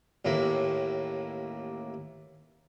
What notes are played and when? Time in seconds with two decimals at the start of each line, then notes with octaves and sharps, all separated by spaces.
0.25 A1 D#2 A2 A#3